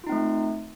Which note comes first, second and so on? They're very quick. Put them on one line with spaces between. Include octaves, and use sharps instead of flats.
F4 D#4 C4 A3